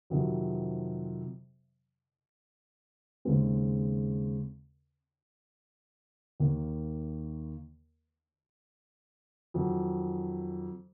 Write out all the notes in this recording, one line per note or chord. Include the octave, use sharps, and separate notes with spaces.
F2 C3 D#3 F#3
D#2 C#3 G#3 C4
D#2 D#3 A#3
F2 D#3 F#3